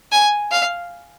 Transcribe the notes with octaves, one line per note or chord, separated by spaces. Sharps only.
G#5
F5